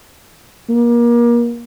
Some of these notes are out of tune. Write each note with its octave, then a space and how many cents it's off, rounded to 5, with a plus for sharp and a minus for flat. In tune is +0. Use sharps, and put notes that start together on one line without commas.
A#3 +30